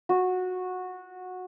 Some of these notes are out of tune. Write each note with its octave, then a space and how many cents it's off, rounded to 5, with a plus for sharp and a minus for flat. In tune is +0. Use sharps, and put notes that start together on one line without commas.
F#4 -15